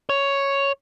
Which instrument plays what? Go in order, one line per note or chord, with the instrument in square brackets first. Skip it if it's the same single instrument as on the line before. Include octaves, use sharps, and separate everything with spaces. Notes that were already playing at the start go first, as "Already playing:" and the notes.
[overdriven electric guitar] C#5